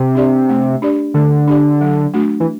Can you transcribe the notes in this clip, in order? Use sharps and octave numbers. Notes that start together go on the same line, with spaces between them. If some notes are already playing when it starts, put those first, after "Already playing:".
Already playing: C3
D4 G4 D5
A3
D4 G4 D5
D3 A3
D4 G4 D5
F#3
A3 D4 F#4
E3